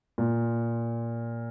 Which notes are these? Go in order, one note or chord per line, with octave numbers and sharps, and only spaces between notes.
A#2